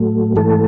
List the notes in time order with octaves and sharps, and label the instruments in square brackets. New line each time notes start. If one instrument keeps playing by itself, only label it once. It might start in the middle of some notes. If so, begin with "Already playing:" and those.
Already playing: [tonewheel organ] A2 F#3 A3
G#2 E3 A3 A4